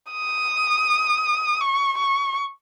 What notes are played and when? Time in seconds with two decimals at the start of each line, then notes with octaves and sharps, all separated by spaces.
0.11 D#6
1.61 C#6
1.97 C#6